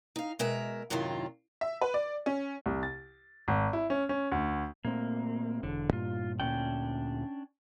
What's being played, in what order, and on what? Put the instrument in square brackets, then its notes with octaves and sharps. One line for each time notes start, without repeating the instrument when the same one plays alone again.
[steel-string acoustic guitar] D#4 F5
B2 G#3 A#4 E5
F#2 A2 C3 D#3 F#3 F4
[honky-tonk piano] E5
B4
D5
C#4
[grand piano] C2
A6
G#1
E4
C#4
C#4
D2
[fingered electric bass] A#2 A3 C4 [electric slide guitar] A#3
[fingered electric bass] E1 [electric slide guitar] D3
[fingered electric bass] G2 A#2 [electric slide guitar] F4
[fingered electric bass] D2 A#2 [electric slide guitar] C#4 D4 G5